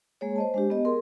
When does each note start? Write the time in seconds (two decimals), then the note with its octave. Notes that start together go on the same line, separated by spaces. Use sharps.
0.21 G#3 A#3 G#4 C#5
0.36 C5 D#5 A5
0.54 G#3 D4 G4
0.70 B3 D#5
0.85 G#4 A#4 C6